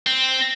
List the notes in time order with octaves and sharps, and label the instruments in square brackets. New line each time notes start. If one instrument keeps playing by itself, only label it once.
[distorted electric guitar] C4